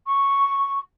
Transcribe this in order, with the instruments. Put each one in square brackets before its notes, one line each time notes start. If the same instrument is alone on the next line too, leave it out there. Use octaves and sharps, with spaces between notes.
[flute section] C#6